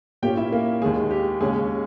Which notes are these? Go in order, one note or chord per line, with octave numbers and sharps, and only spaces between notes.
A#2 A#3 C#4 G4 G5
E4 E5
A#3 A#4
D#2 D#3 G#3 G#4
G4
D#2 C#3 G#3 C#4 G#4